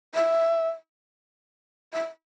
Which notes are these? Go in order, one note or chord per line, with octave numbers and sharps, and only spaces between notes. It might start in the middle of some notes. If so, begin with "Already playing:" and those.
E5
E5